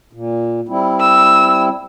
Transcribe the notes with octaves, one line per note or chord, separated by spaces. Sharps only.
A#2
G3 C4 E4
E6